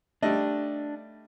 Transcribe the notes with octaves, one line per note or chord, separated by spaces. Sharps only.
G3 A3 D4 D#5